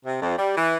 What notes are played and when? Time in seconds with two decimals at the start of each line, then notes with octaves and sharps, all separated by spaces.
0.04 C3
0.20 F2
0.38 G3
0.55 E3